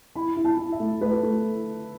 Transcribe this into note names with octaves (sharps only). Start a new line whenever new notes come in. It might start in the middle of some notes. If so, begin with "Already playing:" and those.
E4 B5
E4
A5
E4
E5
A3
A3 B4
A3